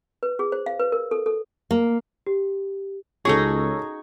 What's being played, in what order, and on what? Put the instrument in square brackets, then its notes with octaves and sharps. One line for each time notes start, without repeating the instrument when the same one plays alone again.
[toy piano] B4
G#4
C5
F5
B4
A#4
A4
A4
[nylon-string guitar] A#3
[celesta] G4
[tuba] C#2 [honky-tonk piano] C#4 A4 [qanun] D#4 F#4 G#4 [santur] C#6